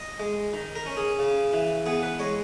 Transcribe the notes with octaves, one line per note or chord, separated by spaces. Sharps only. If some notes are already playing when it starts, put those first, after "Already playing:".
Already playing: D#5
G#3
D#3
A#4
C#4
G#4
C#3
E3
B3 G#4
B4
G#3 C#5